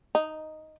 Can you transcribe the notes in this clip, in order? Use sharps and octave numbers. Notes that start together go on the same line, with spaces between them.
D#4